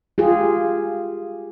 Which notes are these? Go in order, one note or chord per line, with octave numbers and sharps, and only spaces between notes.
F4 G4 G#4